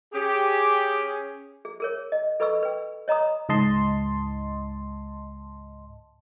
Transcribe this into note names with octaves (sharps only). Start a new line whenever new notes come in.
C#4 G4 G#4
G#4
G#4 A#4 C#5
D#5
A4 B4 D#5 B5 C#6 E6
B4 G5
C#5 D#5 A#5 B5 D#6
C#2 G#2 D#5 A5 C6